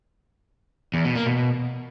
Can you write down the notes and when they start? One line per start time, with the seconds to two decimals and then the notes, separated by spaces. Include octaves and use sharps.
0.94 E2
1.05 B2
1.16 A#3
1.26 B2